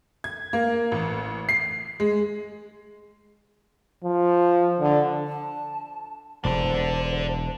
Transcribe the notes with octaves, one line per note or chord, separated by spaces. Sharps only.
G#6
A#3
A1
C7
G#3
F3
D3
A5
E1 E2 D4 A4 C5